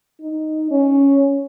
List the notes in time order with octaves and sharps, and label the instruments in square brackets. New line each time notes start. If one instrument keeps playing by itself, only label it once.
[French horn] D#4
C#4